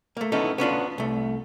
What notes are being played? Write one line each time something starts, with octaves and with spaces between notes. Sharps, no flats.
A3 A#3
B3 C#4 D#4 E4 A4
B3 C#4 D4 F4
C2 A3